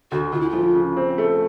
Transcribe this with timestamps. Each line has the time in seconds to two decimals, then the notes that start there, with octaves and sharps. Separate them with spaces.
0.11 D2 F#4
0.33 D2 F4
0.41 E4
0.50 F3 F4
0.75 C#3
0.97 C4
1.18 A3